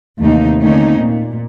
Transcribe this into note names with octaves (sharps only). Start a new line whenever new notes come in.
D#2 C3 E3 A3 A#3 D#4
D3 A3 A#3 C4 C#4 D#4
A#2